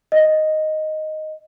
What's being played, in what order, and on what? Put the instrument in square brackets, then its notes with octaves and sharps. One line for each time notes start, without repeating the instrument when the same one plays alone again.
[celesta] D#5